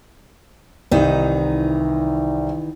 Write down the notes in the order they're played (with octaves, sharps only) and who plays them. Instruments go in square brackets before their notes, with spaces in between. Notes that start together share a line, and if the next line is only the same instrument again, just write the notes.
[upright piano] C2 [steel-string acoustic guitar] D#3 E3 D#4